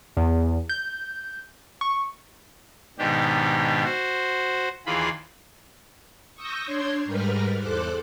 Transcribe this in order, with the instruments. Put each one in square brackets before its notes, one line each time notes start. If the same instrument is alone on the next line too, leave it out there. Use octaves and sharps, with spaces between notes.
[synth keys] E2
G6
C#6
[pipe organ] G#2 B2 D#3 D4 G4
F#4 C5
D#2 E3 F4 G#4 B5
[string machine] C#6 D#6 E6 G6 A#6
D4 C#5 C6 G6 G#6
G#2 G3 A#4 B4 F6
E2 A4 C5 D6 F#6